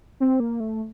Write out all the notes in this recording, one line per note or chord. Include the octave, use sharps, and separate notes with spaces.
C4
A#3
A3